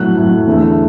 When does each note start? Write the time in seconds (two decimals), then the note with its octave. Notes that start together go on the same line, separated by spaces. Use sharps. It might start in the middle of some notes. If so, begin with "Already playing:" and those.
Already playing: A2 F#3 A3 F#6
0.16 A2 F#3 A3
0.47 E2 D3 A3